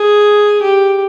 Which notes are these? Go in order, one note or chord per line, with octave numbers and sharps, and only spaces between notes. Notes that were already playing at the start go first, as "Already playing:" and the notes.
Already playing: G#4
G4